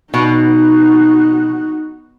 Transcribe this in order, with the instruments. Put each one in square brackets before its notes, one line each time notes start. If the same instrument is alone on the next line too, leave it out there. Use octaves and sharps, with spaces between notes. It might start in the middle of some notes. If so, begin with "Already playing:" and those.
[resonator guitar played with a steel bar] B2 [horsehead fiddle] D#4 F#4